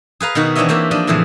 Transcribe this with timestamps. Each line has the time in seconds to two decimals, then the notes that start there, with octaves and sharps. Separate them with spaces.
0.20 G#4 B4 F5 A#5
0.35 B2 D#3 D#4 F#4
0.55 E3 C4 D4 C#5 D#5 E5
0.69 E3 A#3 G4 E5
0.91 F3 D4 D#5
1.07 A2 C3 E3 F3 G#4